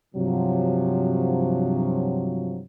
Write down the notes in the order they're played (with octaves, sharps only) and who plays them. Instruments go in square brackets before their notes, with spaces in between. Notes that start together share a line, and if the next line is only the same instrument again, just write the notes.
[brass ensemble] G2 C3 F3 F#3